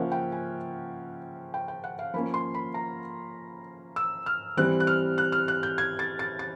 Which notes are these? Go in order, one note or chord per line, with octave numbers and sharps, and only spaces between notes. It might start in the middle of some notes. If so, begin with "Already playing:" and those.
Already playing: C#3 F3 A#3 C#4 E5 F#5
G5
G#5
G5
G5
F#5
F5
F3 A#3 C#4 B5
C6
B5
A#5
E6
F6
E3 G3 C4 F#6
F#6
F6
F#6
F6
F#6
G6
G#6
A6
A6
A6